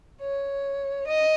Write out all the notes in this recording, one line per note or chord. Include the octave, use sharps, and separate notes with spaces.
C#5
D#5